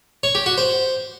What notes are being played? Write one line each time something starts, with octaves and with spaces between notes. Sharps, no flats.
C#5
G4
F#4
C5